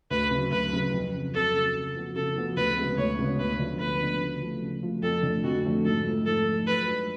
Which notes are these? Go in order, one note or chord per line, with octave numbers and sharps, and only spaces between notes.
D2 B4
C#3 F#3
D2 B4
C#3 F#3
F2
C#3 F#3
F2 A4
C#3 F#3
C#3
F3 B3 F#4
C#3 A4
F3 B3 F#4
D2 B4
C#3 G#3 B3
D2 C#5
C#3 G#3 B3
D2 B4
D3 F3 B3
D2 B4
D3 F3 B3
C#3
F3 A3 F4
C#3
F3 A3 F4
F2 A4
D3 F3 A3
F2 F#4
D3 F3 A3
G#2 A4
F3 A3
G#2 A4
F3 A3
F#2 B4
F3 G#3 D4